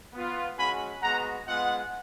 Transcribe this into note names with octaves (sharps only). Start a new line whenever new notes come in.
B3 F4
G#3 C#4 F#4 G#5 B5
G#3 B3 F#4 F#5 A#5
G#3 B3 F4 D#5 F#5